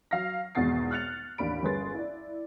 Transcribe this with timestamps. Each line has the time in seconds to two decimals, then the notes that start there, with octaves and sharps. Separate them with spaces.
0.11 F#3 F5 F6 A#6
0.55 G#1 E2 B2 F#5 A6 C7
0.91 F6 F#6 A6 C#7 F7
1.38 A1 D#2 D4 B5 D7
1.63 G1 C#4 G#4 B4 C6 A6
1.95 E4 D5